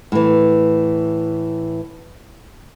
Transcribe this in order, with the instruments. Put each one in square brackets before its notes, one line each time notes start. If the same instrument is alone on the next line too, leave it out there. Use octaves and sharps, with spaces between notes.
[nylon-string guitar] A2 E3